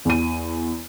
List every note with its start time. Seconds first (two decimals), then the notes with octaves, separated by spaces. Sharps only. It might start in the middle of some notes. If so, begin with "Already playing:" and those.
0.05 E2 D#7